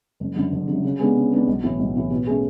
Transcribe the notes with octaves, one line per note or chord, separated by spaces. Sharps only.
F#1
F#2 D3
F#1
D3
F#2
C#3
G#3 B3 D4
C#3
G#3 B3 D4
B1
A2 E3
B1
A2 E3
B2
A3 C#4 G#4